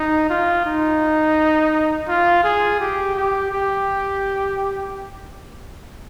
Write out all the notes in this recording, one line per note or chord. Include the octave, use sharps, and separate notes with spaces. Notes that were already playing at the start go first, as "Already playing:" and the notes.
Already playing: D#4
F4
D#4
F4
G#4
G4
G4
G4